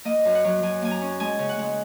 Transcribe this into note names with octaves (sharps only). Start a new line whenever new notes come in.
A#3 D#5
F#2
F#5
F#3
F#3 G#5
A#3 G#5
A#5
C#4
G#3 G#5
C#3
F#5
G#3